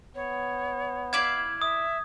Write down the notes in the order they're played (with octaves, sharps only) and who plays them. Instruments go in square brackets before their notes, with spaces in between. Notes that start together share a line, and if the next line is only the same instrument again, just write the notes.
[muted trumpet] B3 [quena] C#5
[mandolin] E4 D5 F5 [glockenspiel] G#6
[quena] E5 [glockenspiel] D#6